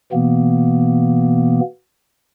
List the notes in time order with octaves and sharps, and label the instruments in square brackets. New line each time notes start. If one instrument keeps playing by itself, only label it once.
[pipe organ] B2 E3 A#3 B3